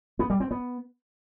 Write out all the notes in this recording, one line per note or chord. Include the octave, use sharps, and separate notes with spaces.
B3
G3
C4
B3